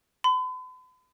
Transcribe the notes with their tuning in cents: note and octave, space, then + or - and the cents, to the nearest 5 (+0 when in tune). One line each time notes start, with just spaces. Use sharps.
B5 +45